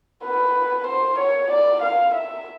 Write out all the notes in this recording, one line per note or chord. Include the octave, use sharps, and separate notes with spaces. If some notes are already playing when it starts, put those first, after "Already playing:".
B4
C5
C#5
D5
F5
E5